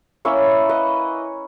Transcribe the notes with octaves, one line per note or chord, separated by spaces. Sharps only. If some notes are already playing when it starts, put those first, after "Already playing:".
A#3 C#4 E4 C#5 E5
B4 D#5